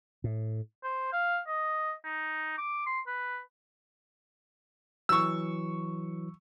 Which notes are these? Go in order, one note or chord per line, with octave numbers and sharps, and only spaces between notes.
A2
C5
F5
D#5
D#4
D6
C6
B4
E3 F#3 C#6 E6